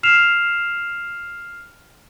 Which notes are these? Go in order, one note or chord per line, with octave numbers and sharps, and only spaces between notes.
F6 C7 E7 F7